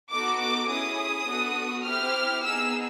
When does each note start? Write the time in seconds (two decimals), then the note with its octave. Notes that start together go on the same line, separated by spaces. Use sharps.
0.11 B3 D#4 F#4 A4 D6
0.40 D6
0.69 C#4 E4 G#4 D#6
1.27 B3 D4 F#4 A4
1.85 C4 E4 G4 F6
2.43 B3 D#4 G#4 E6